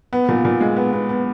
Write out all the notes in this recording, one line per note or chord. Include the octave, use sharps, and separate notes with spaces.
B3
A#2
A#2
G#3
B3
B3
B3